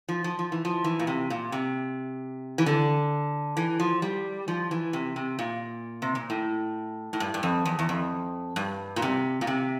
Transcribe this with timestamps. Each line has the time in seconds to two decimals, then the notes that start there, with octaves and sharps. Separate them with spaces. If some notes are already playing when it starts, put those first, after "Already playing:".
0.09 F3
0.24 F3
0.39 F3
0.52 E3
0.65 F3
0.84 E3
0.99 A#2
1.07 C3
1.30 A#2
1.52 C3
2.58 E3
2.66 D3
3.57 E3
3.80 F3
4.02 G3
4.48 F3
4.71 E3
4.93 C3
5.16 C3
5.39 A#2
6.02 C3
6.15 A#2
6.30 A2
7.13 A2
7.20 G2
7.34 G2
7.43 F2
7.65 E2
7.79 E2
7.89 F2
8.56 G2
8.96 A#2
9.02 C3
9.41 A#2
9.47 C3